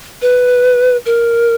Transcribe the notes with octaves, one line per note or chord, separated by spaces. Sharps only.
B4
A#4